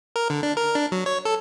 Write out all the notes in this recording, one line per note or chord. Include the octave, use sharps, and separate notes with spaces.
A#4
D3
D4
A#4
D4
F#3
C#5
A4